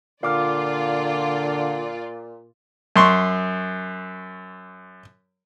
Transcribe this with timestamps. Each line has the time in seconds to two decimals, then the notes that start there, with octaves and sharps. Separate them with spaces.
0.23 A#2 D3 F4 D5 F5 D6 F6
2.96 F#2 C6 C#6